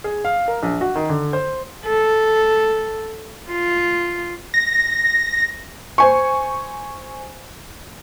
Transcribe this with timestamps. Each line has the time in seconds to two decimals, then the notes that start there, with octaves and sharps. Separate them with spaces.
0.04 G#4
0.25 F5
0.48 A#4
0.63 A#1
0.81 F#4
0.95 D#3
1.09 D3
1.33 C5
1.86 A4
3.50 F4
4.54 A#6
5.98 C5 G#5 C#6